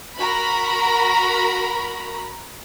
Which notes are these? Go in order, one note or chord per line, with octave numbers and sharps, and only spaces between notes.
F#4 A#4 A#5 B5